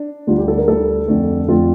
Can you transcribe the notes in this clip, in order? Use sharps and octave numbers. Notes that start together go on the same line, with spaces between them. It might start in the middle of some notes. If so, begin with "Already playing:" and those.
Already playing: D4
D2 D3 G3 F4
G4
A4
A#4
D2 D3 G3 A4
F2 D3 A3
F2 D3 A3 F4